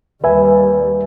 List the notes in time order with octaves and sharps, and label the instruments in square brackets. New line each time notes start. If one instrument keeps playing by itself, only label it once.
[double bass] D#2 G3 [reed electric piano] B4 E5 G#5